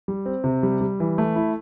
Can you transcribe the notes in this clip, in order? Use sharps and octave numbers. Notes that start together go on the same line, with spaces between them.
G3
C4
C3
G3
G3
E3
A3
E4